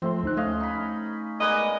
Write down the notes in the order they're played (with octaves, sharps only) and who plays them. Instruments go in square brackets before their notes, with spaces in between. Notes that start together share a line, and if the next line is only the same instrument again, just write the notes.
[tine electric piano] F3 A3 C6 [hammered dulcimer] C4
[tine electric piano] D2 D#4 F#6
[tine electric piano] A3 [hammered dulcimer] C#4 D#5 F5
[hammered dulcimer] D#4 B5
[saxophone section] G#3 B3 D#5 [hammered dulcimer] A#4 B4 D5